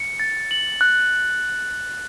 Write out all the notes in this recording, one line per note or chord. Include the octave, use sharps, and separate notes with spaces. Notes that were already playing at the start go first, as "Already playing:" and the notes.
Already playing: C#7
A6
F#7
F#6